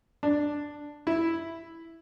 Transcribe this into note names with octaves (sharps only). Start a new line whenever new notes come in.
D4
E4